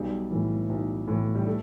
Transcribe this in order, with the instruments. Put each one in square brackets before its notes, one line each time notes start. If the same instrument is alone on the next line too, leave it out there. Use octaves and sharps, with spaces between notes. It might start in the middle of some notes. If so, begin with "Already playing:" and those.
Already playing: [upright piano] B1 G3
A2 E3
B1
A2 E3
G3
A3